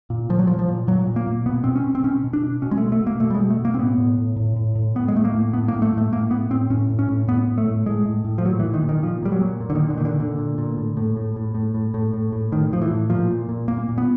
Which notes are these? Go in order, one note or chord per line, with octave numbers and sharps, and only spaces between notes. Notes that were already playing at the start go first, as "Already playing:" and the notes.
A#2
A#2 F3
F#3
A#2 F3
F3
A#2
A#2 F#3
A#2
A#3
A#2
B2 B3
B2 C4
C#4
B2
C4
B2 C#4
B2
D4
B2
B2 C#4
G#3
A3
B2
A3
B2
A#3
B2 A3
G3
G#3
B2
A3
B2
A#3
C4
A2 B3
A2
A2
A2
A2
A2
A2 B3
G#3
A2 A3
A#3
A2
A2 B3
A#3
A2
A3
A2 A3
A2 A#3
A2 B3
A2 C4
A2 C#4
A2
C#4
A2
A2 B3
A2
A3
A2
A2 G#3
A2
A2
F3
A#2 F#3
E3
A#2
D#3
A#2
D#3
A#2 F3
A#2 G3
F#3
A#2
A#2
D3
D#3
A#2
D3
D#3
A#2 D3
A#2 D3
A#2
A#2
A2
A2
A2
A2
A2
A2
A2
A2
A2
A2 D#3
A2 F3
E3
A2
A#2 F3
A#2
A#2
A#2 A#3
A#2
B3